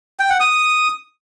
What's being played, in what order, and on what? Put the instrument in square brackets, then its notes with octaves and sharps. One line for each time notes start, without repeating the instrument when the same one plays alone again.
[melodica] G5
F#5
D#6